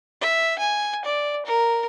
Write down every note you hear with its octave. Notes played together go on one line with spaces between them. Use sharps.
E5
G#5
D5
A#4